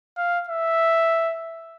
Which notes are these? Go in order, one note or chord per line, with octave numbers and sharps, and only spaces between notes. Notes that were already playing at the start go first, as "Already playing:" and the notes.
F5
E5